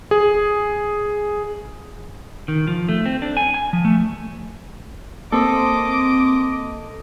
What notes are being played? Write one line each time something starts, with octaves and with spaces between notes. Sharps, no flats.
G#4
D#3
F3
A3
C4
D4
G#5
G#5
F3
A3
A#3 C4 A4 D#5 C6 D6